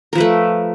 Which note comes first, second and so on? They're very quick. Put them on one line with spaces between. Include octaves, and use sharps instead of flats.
A#4 F3 B4 A3